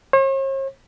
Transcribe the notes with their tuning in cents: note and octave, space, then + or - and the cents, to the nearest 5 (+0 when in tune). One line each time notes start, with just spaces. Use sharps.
C#5 -45